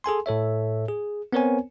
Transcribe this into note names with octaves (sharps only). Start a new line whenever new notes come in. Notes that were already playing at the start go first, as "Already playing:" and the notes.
G#4 A4 G#5 C6
A2 A4 C#5 E5
G#4
B3 C4 A#4 C5 C#5 G#5